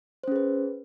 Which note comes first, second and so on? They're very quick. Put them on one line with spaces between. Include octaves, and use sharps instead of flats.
C5 C#4 G#4 B4